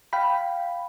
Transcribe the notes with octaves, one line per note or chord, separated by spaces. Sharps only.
F5 G5 B5